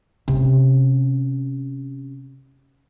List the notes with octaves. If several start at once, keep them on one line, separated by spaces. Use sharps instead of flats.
C3 C#4